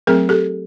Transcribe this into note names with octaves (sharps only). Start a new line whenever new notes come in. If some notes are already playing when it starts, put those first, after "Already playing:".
F#3 A3 C4 G#4 A#4
G4 A4